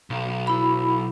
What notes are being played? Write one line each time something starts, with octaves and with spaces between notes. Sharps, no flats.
B1
E4 B5